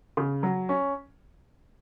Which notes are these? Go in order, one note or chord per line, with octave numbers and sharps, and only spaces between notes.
C#3
F#3
C#4